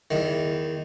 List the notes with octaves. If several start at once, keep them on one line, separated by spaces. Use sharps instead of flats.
E2 D#3